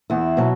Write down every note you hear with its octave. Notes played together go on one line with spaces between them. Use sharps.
E2 E4
B2 F#3